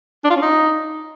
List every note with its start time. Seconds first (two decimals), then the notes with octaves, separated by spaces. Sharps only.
0.24 D4
0.30 F4
0.36 C#4
0.42 D#4